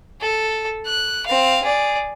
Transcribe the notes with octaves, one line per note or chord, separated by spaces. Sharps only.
A4
F#6
C4 F5
G#4 D5